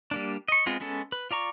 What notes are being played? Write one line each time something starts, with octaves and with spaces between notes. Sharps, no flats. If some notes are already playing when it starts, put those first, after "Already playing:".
G3 A#3 D4
D#5 C#6
G#3 B3 C4 F4
G#3 B3 C#4 A4
B4
F4 D5 A#5 C#6